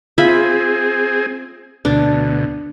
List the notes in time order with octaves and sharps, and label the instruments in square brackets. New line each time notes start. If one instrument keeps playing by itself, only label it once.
[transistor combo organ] C4 G#4 [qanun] F4 E5 B5
[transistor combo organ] D2 B2 [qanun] D4